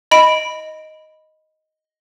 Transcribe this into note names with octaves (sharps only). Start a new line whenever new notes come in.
D#5 B5 D7